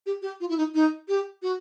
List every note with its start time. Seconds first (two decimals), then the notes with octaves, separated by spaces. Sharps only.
0.06 G4
0.22 G4
0.40 F4
0.49 E4
0.57 D#4
0.74 D#4
1.08 G4
1.42 F#4